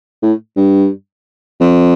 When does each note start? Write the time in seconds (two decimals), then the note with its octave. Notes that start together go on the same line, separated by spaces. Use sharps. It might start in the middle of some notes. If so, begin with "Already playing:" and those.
0.22 A2
0.57 G2
1.60 F2